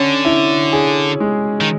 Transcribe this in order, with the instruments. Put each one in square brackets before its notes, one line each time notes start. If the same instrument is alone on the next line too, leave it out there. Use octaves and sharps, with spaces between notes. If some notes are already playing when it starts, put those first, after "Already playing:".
Already playing: [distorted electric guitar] D3 [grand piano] C#4
[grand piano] E4
G#4
G#3
[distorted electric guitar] D#3